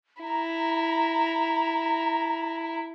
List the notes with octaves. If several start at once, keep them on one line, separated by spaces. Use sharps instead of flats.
E4 A#5